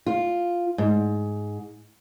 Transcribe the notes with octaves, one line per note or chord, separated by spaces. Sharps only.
F4
G#2